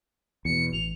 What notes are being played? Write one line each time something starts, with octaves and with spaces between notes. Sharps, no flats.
E2 B2 C#7
A1 F7